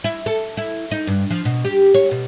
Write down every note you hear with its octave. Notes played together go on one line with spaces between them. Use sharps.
E4
A4
E4
D#4
G2
F3
B2
G4
C#5
B2